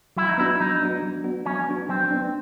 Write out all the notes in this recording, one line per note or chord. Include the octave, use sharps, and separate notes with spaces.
F#3 E4
D#4
B3 D4 E4 F#4
F#3 D#4
B3 D4 F#4
F#3
B3 D4 F#4
F#3 C#4
B3 D4 F#4
F#3 C4
B3 D4